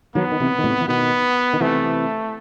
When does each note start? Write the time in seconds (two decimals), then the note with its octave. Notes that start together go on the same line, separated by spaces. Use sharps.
0.15 D#3 F#3 B3
0.32 D#3
0.40 C3 E3
0.59 D#3
0.64 A2 C3
0.81 E3
0.88 B2 D#3 B3
1.53 D#3
1.61 C3 E3 A3